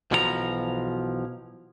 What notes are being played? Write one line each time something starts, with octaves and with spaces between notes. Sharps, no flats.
B1 B2 E3 F3 G#4 A#5